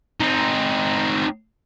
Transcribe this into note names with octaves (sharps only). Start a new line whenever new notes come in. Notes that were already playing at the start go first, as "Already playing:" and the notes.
C4 D#4